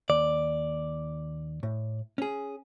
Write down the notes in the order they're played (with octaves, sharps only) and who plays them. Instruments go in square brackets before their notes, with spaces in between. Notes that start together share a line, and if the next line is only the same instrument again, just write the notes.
[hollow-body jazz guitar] D#2 [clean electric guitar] D5
[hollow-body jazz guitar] A2
C#4 G#4